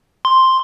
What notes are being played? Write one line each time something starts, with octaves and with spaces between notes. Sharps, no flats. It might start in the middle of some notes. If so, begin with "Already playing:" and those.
C6